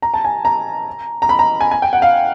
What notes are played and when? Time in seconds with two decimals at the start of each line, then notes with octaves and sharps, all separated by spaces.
0.02 A#5
0.14 A5
0.25 G#5
0.45 A#5
1.22 A#5
1.29 B5
1.39 A#5
1.61 G#5
1.71 G#5
1.82 G5
1.93 F#5
2.02 F5